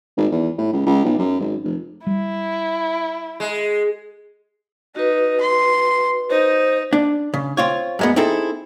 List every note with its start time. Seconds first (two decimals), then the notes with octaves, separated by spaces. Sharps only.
0.17 G#1
0.31 E2
0.58 A2
0.73 C#2
0.87 C#2
1.05 B1
1.19 F#2
1.40 G#1
1.64 F1
2.07 G3 E4
3.40 G#3
4.96 D#4 F#4 B4
5.41 C6
6.30 D#4 C5
6.93 D4
7.34 C#3
7.57 C4 F4 C#5
7.99 F#2 G#3 B3
8.16 C4 D#4 E4 G#4 A4